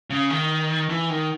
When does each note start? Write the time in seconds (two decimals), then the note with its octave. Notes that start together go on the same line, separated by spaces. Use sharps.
0.10 C#3
0.30 D#3
0.90 E3
1.10 D#3